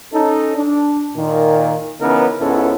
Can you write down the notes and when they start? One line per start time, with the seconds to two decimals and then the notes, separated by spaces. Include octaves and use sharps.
0.13 C#4 D#4 A4
0.56 D4
1.17 A#2 D#3
2.01 C#3 E3 B3 C#4 D#4 A#4
2.39 C#2 G#2 B3 C#4 E4 A4